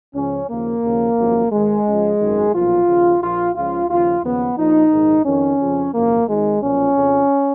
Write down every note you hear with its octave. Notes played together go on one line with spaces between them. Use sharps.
C#2 C#3 F3 C#4
D#2 C#3 F3 A#3
D#2 C#3 F3
G#1 F#2 F3
G#1 G#2 D#3 G#3
C#2 C#3 F3
G#1 F#2 D#3
B1 A#2 F3 F4
D#2 C#3 F3
A#1 A#2 F3 F4
C#2 C#3 F3 F4
D#2 C#3 F3 F4
D#2 C#3 F3 B3
A#1 A#2 F3 D#4
A#1 G#2 D#3
F2 D#3 C#4
F2 C#3 F3
G#1 F#2 C#3 F3 A#3
G#1 G#2 D#3 G#3
B1 A#2 F3 C#4
F2 C#3 F3